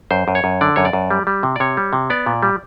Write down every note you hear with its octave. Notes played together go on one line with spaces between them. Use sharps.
F#2 C5
F#2
C#5
F#2
D3 D5
F#2 C#5
D5
F#2
G3
G3
C3
D5
C3 C#5
G3
C3
B3 D5
A#2
G3